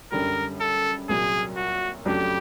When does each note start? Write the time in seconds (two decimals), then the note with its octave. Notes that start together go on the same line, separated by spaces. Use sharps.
0.12 F#2 D3 G3 A#4
0.61 A4
1.09 C2 A#2 F#3 G#4
1.57 F#4
2.05 F2 C#3 F#3 A3 D4 G4